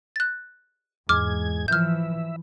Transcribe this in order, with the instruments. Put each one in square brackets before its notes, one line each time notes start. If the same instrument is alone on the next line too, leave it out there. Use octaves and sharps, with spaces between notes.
[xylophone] F#6 A6
[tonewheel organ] E2 G#3 G#6 [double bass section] G#2 [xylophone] D6 F6
[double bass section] E3 F3 [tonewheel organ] E5 [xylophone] F6 G6